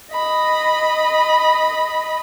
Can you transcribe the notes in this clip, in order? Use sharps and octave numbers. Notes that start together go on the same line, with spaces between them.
D#5 B5